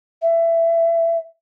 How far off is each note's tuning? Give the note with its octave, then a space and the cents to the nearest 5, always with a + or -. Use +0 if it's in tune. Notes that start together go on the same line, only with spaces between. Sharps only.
E5 +20